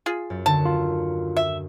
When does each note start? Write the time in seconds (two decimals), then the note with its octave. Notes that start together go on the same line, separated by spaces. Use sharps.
0.06 F4 G#4
0.30 F#2 A6
0.46 D#2 D3 A5
0.65 F4
1.37 E5